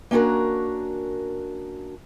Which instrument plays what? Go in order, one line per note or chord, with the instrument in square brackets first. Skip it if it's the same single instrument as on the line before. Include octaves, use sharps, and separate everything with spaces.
[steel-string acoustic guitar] A#3 C#4 D4 F#4 A#4